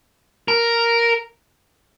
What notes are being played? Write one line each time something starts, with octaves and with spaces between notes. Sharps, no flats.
A#4